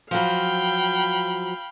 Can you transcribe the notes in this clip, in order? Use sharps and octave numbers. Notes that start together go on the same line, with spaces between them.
F3 F#3 F5 G5 B5